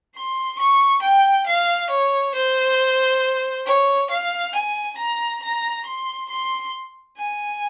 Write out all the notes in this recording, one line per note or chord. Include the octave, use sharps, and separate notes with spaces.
C6
C#6
G5
F5
C#5
C5
C#5
F5
G#5
A#5
A#5
C6
C6
G#5